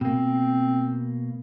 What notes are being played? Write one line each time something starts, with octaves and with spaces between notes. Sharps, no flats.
B2 A#3 C4